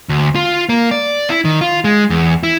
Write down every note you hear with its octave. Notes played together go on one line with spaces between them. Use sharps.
D2
F4
A#3
D5
E4
D#3
F4
G#3
E2
E4